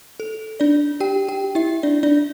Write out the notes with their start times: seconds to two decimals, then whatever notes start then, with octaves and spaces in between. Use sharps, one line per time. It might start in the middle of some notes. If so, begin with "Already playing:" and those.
0.20 A4
0.60 D4 D5
1.00 G4 G5
1.28 G4 G5
1.55 E4 E5
1.83 D4 D5
2.03 D4 D5